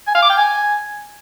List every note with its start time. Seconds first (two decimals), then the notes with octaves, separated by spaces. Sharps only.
0.07 G#5
0.15 F5
0.22 D6
0.30 G5
0.37 G#5